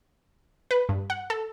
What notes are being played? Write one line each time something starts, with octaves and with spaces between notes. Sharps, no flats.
B4
G2
F#5
A4